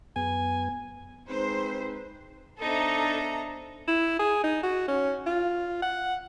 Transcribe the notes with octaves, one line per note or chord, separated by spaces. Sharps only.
F#2 B3 G#5
G#3 C4 D#4 B4 C5
B3 D4 D#4 A4 C5 D#5 E5 A#5
E4
G#4
D#4
F#4
C#4
F4
F#5